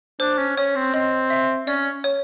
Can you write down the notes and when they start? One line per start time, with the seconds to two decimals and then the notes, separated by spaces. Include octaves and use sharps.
0.20 D4 C5
0.38 C#4
0.57 C#4 C#5
0.76 C4
0.94 C4 D#5
1.30 E5
1.67 C#4 D5
2.04 C#5